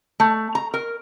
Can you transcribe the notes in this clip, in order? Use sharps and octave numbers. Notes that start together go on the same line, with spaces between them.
A3
A#5
A#4